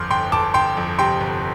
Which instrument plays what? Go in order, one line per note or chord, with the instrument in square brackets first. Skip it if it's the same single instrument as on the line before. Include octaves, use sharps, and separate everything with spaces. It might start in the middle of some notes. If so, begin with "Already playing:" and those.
Already playing: [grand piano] G1 F2 C6 D6 F6 G6
G1 G5 C6
G1 A5 D6
G1 G5 C6
F2
C3 G5 C6
G1